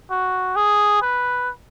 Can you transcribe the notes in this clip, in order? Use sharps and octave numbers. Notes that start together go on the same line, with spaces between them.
F#4
G#4
B4